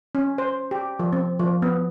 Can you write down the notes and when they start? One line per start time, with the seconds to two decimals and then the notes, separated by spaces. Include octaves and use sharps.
0.15 C#4
0.38 C5
0.71 G4
0.99 F3
1.13 C4
1.39 F3
1.62 B3